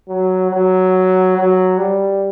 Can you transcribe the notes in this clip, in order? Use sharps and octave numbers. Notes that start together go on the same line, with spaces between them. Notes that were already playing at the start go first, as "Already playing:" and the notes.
F#3
F#3
F#3
G3